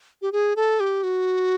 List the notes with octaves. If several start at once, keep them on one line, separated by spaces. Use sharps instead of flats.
G4
G#4
A4
G4
F#4